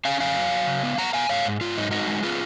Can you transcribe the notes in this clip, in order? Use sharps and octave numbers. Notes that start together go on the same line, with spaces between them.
C#4 F5 G#5
F#2 F5 G#5
F#3
F#3
C#3
B3
B3 F#5 A#5
B3 F5 G#5
G#2 C#5 F5
G#2
G#2 F4
F#3 D#4
G#3 D#4 F#4
G#3
B3 F4 G#4